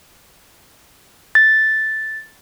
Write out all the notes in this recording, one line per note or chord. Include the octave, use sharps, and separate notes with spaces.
A6